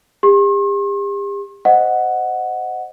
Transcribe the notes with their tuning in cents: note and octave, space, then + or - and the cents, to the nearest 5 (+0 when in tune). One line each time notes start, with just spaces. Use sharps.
G4 +45 C6 +45
C5 +0 D#5 +0 F#5 +0